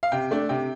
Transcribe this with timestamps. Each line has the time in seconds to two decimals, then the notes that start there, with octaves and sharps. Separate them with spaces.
0.03 F5
0.12 C3 G5
0.31 A3 D4
0.49 C3 G5